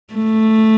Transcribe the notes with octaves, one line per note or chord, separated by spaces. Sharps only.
A3